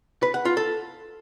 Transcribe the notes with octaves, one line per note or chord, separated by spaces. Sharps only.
B4
F#5
F4
A4